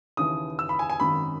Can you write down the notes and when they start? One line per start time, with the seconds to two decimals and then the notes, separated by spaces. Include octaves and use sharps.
0.17 D#2 C#3 E3 D#6
0.59 E6
0.69 B5
0.79 G#5
0.90 G#5
1.00 G#1 F#2 D#3 B5